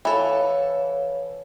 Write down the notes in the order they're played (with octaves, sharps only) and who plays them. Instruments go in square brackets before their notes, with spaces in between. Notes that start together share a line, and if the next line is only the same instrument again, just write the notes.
[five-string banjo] E3 A4 [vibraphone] C#5 F5